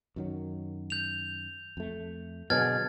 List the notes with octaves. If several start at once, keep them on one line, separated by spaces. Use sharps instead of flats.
F#2 D#3 F#3
G6 F7
F2 A3
B2 D3 F#3 G#4 F6 G#6 A6